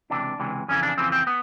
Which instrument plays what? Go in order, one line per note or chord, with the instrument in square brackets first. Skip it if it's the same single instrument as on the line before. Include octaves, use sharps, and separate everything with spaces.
[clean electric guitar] C#2 C3 E3 D4
C#2 C3 E3
F2 C#3 E3 C#4
D4
F2 C#3 E3 C4
C4
B3